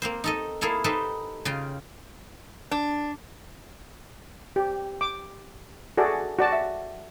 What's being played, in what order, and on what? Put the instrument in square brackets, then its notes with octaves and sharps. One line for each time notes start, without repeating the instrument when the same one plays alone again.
[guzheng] A#3 C4 C5
D#4 A4 D#5
A#3 E4 G#4 A4 F5
D#4 G4 A4 B4 C5
C#3 F4 G5
[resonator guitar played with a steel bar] D4
[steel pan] G4
D6
F#4 G#4 A4 D5
F#4 D5 A5
E5